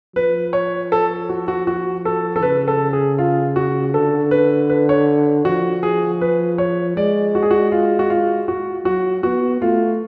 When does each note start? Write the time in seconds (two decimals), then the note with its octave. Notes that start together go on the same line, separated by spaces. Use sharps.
0.16 F3 B4
0.53 C#5
0.92 A4
1.29 F#4
1.48 F#4
1.67 F#4
2.05 A4
2.36 A4
2.42 C#3 B4
2.68 A4
2.93 G#4
3.18 F4
3.56 F#4
3.94 D3 A4
4.31 B4
4.70 B4
4.89 C#5
5.45 F3 F#4
5.83 G#4
6.21 B4
6.58 C#5
6.97 G#3 D5
7.35 F#4
7.43 G#4
7.51 F#4
7.72 F4
7.99 F#4
8.10 F4
8.48 F#4
8.85 F#3 F#4
9.23 B3 F#4
9.61 A3 F4